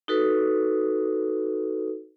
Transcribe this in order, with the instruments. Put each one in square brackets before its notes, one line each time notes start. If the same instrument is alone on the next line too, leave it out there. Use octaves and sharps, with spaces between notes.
[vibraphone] D#4 F#4 A4 B4